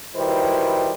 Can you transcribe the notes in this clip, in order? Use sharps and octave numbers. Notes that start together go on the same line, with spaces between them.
D#3 G3 E4 F#4 B4 C5